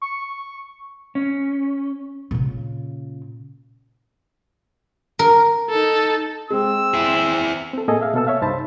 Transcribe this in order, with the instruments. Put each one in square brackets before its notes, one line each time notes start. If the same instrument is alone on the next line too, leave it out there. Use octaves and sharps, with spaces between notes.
[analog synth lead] C#6
[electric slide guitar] C#4
[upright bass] A#2 C#3
[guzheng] A#4
[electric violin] D#4 A4
[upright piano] G#3 [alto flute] C4 [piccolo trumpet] E6
[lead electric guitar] E4 G#4
[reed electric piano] C4 A4
A2 A#3 G#4 A4 D#5 G#5
G#4 E5 F5
B2 A#3 B3 A4 A5 E6
C#5 E5 F5
C2 G2 D#4 C5 A5 B5